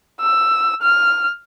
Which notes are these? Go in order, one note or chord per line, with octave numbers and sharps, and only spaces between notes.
E6
F6